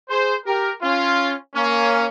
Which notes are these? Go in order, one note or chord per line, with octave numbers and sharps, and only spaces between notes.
G#4 C5
G4 A#4
C#4 F4
A#3 C#4